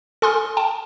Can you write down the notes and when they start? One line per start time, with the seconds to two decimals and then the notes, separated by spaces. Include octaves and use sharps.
0.22 A4 G#5 C6 D#6 F6
0.57 G5 A5